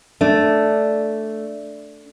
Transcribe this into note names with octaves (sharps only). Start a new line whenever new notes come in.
A3 D4 D5